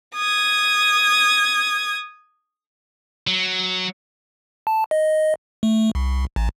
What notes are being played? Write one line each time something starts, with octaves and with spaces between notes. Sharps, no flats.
D#6 G#6
F#3
A5
D#5
A3
C2
A1